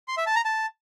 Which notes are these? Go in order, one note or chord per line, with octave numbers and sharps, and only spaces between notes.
C6
E5
A5
A#5
A5